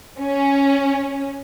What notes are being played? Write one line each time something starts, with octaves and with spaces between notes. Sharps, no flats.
C#4